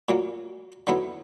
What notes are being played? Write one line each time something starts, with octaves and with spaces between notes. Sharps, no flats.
A#2 F#3 A#3
D3 F#3 B3 E4